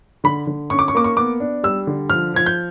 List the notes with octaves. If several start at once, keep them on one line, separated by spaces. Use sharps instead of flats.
D3 B5
D3
C#4 C#6
D6
C#6
A#3 D6
C#6
B3 D6
D4
G3 E6
D3
F3 F6
F3 G#6
G6